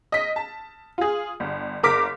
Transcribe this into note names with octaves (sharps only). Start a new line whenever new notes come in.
D#5 B6
A5
F4 G#4
G1
F#1 A#4 D6 B6